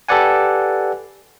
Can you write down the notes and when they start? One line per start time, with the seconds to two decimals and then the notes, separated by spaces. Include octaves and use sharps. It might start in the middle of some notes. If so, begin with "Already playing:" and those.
0.08 G4 A4 B4 D5 F#5 G#5